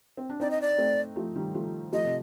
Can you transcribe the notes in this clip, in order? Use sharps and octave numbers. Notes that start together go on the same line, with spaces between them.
C4
D4
C4 D#4 D5
D#5
D5
A3 C4
F3 A3
D#3 G3
F3 A3
F3 A3 D#5
C3